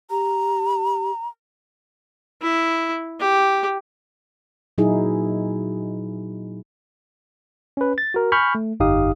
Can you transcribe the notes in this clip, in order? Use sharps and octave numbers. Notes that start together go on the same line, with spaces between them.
G4 A#5
E4
G4
A#2 F#3 D#4 E4 G#4
C#4 B4
A6
F#4 A#4
G#5 B5 C#6 F6 G6
A3
G1 F2 D#4 G4 F5 D#6